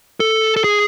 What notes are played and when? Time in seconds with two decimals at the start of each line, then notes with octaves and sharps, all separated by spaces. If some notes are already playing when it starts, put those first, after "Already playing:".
0.20 A4
0.56 A4
0.64 G#4